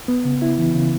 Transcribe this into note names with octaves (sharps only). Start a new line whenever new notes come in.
B3
C#3
E4
E3
C#3